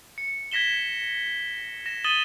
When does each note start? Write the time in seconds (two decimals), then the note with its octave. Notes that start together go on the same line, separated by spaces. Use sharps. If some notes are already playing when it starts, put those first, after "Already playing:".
0.18 C#7
0.51 G#6 A#6 B6 E7 G7
1.86 A#6 E7
2.04 D#6 A6 D#7 E7 F#7 G7